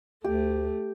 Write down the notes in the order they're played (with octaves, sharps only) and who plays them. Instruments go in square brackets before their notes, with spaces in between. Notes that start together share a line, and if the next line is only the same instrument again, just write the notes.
[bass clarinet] D2 [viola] A3 [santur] G4